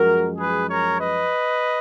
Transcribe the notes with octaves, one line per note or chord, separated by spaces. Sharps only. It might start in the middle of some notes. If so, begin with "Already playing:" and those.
Already playing: F#2 F3 G#3 F#4 A#4
G#4 B4
A#4 C#5
B4 D#5